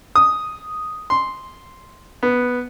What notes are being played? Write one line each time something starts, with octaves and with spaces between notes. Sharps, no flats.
D#6
C6
B3